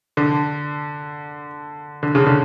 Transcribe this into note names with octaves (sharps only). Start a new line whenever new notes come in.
D3
D3
C#3
D3